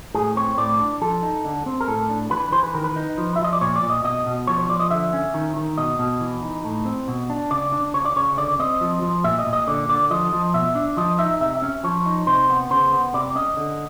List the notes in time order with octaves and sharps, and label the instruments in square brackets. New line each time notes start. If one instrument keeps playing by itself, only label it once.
[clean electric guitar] A2 G#4
C4 C#5
A2 D5
D4
F3 A4
D#4
D3
C4
A#4
A2 A4
D4
E3 B4
E3 C5
B4
D#3 A#4
B4
D#4
F3
E5
F3
D#5
D5
A#2 C#5
D5
A#2
D#5
B2 D#5
B2
F3 C#5
C#5
F3 D5
D#5
D3 E5
C#4
D#3
D#3
B2 D#5
B2
E3
D#4
A2
C4
B2
D4
C#3 D5
D4
C#3 C#5
D5
C#3 C#5
D3 D5
C4 D#5
F3
F3
A#2 E5
D#5
A#2
D#5
D3 D5
D3 D5
F3 D#5
F3
B2 E5
D4
F3 D#5
D#4 E5
C3 E5
E5
C#4
F3 C#5
D#4
C3 C5
B3
C#3 C5
B3
C3 D5
C#4 D#5
D3